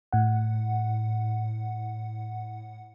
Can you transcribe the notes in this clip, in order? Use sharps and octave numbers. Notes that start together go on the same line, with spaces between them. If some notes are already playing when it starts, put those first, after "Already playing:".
A2 F#5